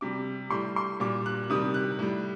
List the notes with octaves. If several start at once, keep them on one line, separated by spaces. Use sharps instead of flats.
C3 G3 D6
A2 G3 C6
C6
A#2 G3 D6
F#6
C3 D#3 G3 D#6
F#6
A2 G3